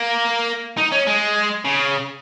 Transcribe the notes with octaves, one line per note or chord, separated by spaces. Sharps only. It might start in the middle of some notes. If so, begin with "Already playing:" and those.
Already playing: A#3
D#4
C#4
G#3
C#3